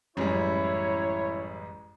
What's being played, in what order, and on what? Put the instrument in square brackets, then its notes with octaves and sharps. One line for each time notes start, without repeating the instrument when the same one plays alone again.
[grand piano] A1 G3 G#3 [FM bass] F#2 [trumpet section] E4 [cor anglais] C#5